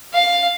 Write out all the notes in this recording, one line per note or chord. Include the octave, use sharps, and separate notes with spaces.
F5